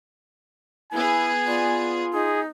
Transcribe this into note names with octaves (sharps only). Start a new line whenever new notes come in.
B3 E4 G#4 G#5
F4 D5
D#4 G#4